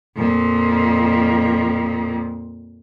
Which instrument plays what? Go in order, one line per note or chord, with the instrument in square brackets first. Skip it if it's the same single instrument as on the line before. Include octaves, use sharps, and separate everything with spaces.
[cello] F2 A#2